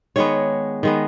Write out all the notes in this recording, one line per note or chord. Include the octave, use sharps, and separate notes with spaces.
D#3 G#3 B3 C#5
D#3 G#3 B3